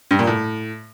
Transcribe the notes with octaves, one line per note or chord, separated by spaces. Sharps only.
G2
A#2
A2